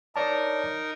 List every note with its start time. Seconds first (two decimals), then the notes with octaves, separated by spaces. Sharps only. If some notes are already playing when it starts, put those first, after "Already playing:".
0.16 D#4 A#4 C#5 D5 A5